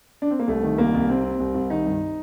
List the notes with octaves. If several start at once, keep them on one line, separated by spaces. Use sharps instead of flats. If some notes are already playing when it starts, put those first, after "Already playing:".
D4
C4
A#3
C2 A3
D#3
C2 A#3
C2
C3 C4
C3
C2
C2
D#3 D#4
G2